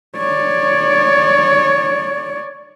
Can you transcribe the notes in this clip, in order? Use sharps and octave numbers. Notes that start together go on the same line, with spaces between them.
C#5 D5